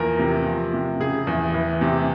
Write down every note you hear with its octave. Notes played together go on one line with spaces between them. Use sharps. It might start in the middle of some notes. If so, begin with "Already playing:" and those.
Already playing: E2 F3 A#3 A#4
C3
F3
C3
C#3 G#4
E2
E3
C3